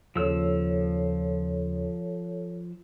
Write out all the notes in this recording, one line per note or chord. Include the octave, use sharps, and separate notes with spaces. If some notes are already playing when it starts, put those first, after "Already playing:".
D#2 C#3 F3 A4 C#5 E6